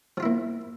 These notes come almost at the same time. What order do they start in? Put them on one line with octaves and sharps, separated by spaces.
F3 F4 E4 A#3